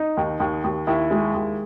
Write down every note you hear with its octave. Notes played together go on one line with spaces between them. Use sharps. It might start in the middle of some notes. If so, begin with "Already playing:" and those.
Already playing: D#4
D#2
D#2
D#2
D#2 E4
G#3
D#2